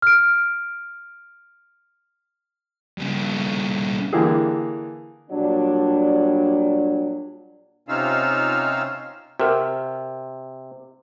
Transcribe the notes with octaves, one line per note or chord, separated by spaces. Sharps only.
F6 D7
G2 C#3
D3 E3 A#3 G4 G#4
A#2 F#3 G3 D4
C3 C#4 D#4 F4 F5 E6
C3 F#4 A#4 F#5